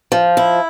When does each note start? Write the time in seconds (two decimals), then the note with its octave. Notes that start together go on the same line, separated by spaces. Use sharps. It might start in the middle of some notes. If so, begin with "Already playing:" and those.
0.12 F3
0.37 E4